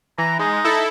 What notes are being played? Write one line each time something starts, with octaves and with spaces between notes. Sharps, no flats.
E3 A#5
G#3 D#4
E4 A4